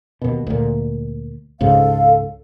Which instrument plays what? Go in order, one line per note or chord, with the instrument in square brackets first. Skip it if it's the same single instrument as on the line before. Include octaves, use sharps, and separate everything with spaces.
[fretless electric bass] D#2 B2
D2 A#2
[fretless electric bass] C#2 G#2 C#3 [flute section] A4 F5